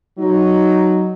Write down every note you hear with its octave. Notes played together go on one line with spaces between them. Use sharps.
F#3 D#4